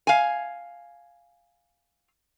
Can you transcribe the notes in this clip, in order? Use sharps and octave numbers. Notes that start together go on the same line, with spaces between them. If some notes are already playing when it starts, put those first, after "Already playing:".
F5 G#5